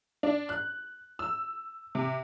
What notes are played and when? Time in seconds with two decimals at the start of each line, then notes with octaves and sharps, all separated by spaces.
0.23 D4
0.49 F#6
1.19 E6
1.95 C3